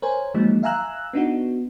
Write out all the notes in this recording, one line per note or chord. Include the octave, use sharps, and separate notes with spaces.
A#4 C5 C#5 G#5
D#3 F3 F#3 G#3 A#3 D#4
E5 F5 G#5 A#5 E6 F#6
B3 D4 D#4 F#4